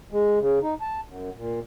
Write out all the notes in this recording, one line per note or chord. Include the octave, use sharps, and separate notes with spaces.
G#3
C#3
D#4
A5
F#2
A#2